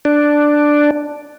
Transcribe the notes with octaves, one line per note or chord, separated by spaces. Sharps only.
D4